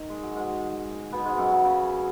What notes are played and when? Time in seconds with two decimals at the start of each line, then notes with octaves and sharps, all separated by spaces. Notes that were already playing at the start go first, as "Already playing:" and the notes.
Already playing: D#3
0.10 G#3
0.23 F#3
0.36 G#2 G#3
1.12 B2 B3
1.25 G#2 G#3
1.38 F#2 F#3
1.52 C#3
1.65 C#3